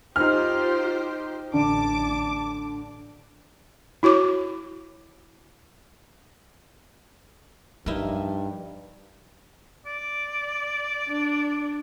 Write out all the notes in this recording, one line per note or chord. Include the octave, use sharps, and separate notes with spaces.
D#4 F4 G4 C5 F6
A1 D3 A5 D6
E4 F#4 C#5 D6
G2 F3 D#4 E4 A#4
D5
D4